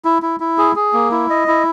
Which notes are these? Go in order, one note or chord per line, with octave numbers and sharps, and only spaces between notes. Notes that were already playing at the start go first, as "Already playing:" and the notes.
E4
E4
E4
G#4
G#4
A#3
E4
D#5
E4